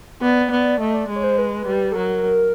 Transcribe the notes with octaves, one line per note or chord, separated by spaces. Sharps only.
B3 D5
B3 D5
A3 D#5
D5
G#3
C#5
C5
B4
G3
A4
F#3 A#4